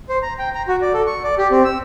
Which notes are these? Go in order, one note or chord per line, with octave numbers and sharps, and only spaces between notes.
C5
A#5
G5
A#5
F#4
D5
A4
C#6
D5
G4
C4
E6